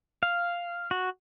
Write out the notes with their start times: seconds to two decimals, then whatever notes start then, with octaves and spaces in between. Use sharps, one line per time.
0.23 F5
0.91 F#4